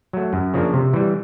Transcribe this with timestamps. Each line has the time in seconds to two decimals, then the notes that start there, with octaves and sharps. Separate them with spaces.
0.13 F#3 A3
0.33 F#2
0.54 C#3 F3 A#3 D4
0.73 C3
0.93 E3 G3